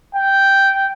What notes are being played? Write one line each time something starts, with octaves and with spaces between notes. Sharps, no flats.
G5